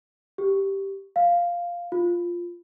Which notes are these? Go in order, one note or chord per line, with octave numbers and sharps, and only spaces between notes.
G4
F5
F4